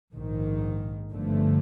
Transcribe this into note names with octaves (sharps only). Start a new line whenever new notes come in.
A#1 G#2 D#3
G1 G2 D3 F3 A3